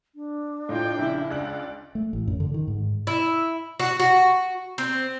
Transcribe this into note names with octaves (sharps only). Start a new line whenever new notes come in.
D4
A2 F4 D#5 G5
A#1 C#3 E4
C#2 D5 F#6 F#7
A3
A1
F#2
D3
D#3
G#2
E4
F#4
F#4
C4